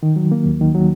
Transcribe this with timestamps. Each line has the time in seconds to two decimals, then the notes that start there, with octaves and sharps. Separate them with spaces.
0.03 D#3
0.16 F#3
0.32 A#3
0.46 D#2
0.61 D#3
0.75 F#3